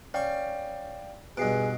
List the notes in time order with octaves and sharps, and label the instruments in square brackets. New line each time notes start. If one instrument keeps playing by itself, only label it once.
[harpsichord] C#4 C#6 [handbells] D5 F5 G5
[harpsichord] G2 B2 [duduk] G#4 [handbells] D#5 C7 D7